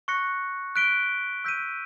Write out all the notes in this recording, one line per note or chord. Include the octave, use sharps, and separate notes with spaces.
C#6 F#6 A#6 C#7
F#6 B6 D7 G7
E6 G6 B6 D#7